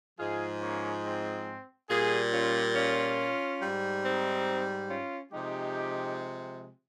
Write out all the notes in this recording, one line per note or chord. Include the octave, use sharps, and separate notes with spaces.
G#2 F3 G#3 F4 G#4
A#3 C#4
C4
A#2 G3 F4 G#4
C#4 F4
C#4 F4
G#2 G3
C4 D#4
C#4 F4
C3 F3 G#3 D#4 G4